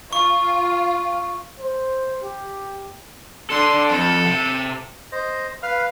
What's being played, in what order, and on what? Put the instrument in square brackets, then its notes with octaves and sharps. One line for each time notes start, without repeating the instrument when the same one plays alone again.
[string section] F4 [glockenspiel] C#6
[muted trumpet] C5
G4
[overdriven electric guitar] D4 A4 [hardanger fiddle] C6
[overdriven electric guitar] F2 [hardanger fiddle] A4
[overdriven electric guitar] C3
[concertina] C5 D#5
B4 F5 F6